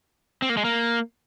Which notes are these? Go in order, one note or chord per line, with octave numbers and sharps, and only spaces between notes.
C4
A#3
G#3
A#3